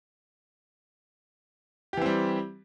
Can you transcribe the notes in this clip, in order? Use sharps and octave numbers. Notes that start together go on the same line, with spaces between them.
E3 G3 C4 G4